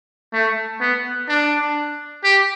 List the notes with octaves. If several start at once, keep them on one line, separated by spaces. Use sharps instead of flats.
A3
B3
D4
G4